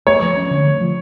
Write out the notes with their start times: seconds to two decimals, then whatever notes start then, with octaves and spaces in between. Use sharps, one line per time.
0.07 A3 C#5
0.22 F3
0.37 C#4
0.51 D3
0.67 A3
0.81 F3